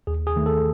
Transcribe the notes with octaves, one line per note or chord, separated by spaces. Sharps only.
D#2 G#4
G#4
D#3 A3
A4